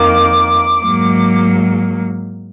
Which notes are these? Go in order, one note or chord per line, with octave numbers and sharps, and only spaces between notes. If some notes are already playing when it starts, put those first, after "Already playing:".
Already playing: F2 D#3 A#3 D6
G#2 F#3 A#3